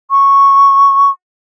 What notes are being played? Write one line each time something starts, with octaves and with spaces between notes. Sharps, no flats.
C#6